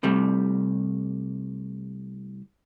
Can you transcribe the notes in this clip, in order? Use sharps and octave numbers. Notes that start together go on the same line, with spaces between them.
C2 C3 G3 A3